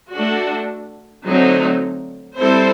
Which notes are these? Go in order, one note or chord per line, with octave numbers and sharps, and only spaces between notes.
A3 D4 F#4
D3 F#3 A3 C4 D#4
G3 C4 E4 A4 C5